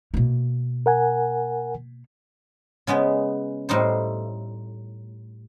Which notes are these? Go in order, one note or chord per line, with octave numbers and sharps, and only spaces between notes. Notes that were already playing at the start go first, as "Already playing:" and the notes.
B2 A#3
A#4 F#5 G#5
C#3 G#3 B3 B4
A2 G3 D#4 C5